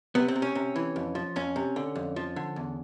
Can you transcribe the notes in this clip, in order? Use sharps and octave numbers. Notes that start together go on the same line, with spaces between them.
C3 B3
C4
C3
C#4
C3
E3
F2
F3
F2 C#4
C3
D3
F2
F3
D3
E2